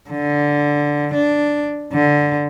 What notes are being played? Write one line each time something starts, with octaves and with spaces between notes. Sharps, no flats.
D3
D4
D3